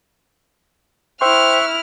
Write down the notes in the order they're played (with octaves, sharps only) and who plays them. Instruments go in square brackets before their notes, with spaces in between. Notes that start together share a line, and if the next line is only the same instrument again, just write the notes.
[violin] E4 F6 [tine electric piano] C5 G5 C6 [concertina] E5 C#6 F#6